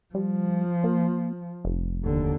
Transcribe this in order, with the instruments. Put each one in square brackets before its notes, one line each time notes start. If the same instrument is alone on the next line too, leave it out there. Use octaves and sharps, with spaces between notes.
[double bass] F3 [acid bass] G3
[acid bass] A#3
F1
[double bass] D#2 D3